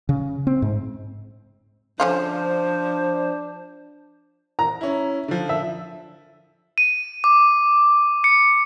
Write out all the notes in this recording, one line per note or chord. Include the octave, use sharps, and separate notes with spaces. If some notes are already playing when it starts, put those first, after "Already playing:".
C#3
C4
G#2
D3 F3 C#4 D4 F4 C5
A#5
C#4 E4
D3 F3
E5
D#7
D6
C#7